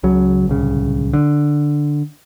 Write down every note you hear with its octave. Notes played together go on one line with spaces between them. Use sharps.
C#2 C#3 F#3
D1 C2 C#3
D3